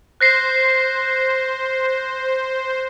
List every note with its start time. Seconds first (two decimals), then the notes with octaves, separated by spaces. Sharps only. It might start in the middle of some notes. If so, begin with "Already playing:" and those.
0.21 C5 F#6 A#6 C7